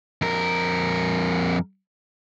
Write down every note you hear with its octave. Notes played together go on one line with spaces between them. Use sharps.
F2 A#4